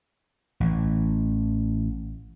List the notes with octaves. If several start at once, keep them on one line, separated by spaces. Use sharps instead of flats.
A1 E3